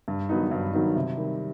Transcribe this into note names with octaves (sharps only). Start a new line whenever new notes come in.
G2
D#3 F#3 B3 D#4
G2
D#3 F#3 B3 D#4
C3
D#3 G3